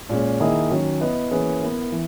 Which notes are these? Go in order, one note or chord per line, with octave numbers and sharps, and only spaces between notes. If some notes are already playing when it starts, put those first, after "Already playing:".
A#2 G#3 C#4
D#3 A#3 E4 G#4 D#5
D#3 F#3 C#4
B3 E4 B4 D#5
E3 A#3 C#4 G#4 B4
B3 E4 A#4
E3